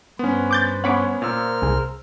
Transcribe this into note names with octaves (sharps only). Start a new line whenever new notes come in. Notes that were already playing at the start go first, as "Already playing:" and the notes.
G2 B3 C#4 B4 C5
D6 G6 A6
B3 C#4 C#5 F#5 B5 D6
A#2 A#4 C5 E6 F6
C2 G#4